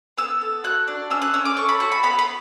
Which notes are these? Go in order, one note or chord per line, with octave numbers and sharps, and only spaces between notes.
B3 E6
A4
F#4 F#6
D4
C#4 E6
F#6
C#4 E6
D6
A4 C#6
B5
F#4 C#6
B5
B3 B5
B5